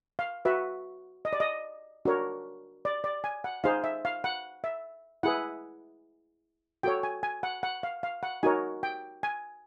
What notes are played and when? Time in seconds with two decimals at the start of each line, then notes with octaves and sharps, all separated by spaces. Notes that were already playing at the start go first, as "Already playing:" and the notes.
0.19 F5
0.45 F#4 B4 E5
1.25 D#5
1.33 D5
1.40 D#5
2.05 D4 F#4 A#4 C#5
2.85 D5
3.04 D5
3.24 G#5
3.44 F#5
3.64 D#4 G#4 C5 F5
3.84 E5
4.05 F5
4.24 F#5
4.64 E5
5.23 E4 G#4 B4 F#5
6.83 F#4 A4 C#5 G5
7.03 G#5
7.23 G#5
7.43 F#5
7.63 F#5
7.83 F5
8.03 F5
8.23 F#5
8.43 D#4 F#4 A#4 C#5 G#5
8.83 G5
9.23 G#5